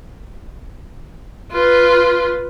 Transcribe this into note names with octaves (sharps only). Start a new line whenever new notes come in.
F4 B4